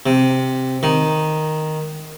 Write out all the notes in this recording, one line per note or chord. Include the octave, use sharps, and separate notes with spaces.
C3
D#3